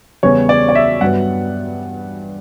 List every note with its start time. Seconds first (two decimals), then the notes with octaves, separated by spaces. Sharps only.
0.23 E2 C#3 G3 B3 C#5
0.49 D5
0.69 D5
0.75 E5
1.01 G2 F#3 B3 F#5